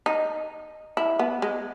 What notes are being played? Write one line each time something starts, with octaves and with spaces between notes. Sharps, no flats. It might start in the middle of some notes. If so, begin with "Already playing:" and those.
D#4
E4
B3
G#3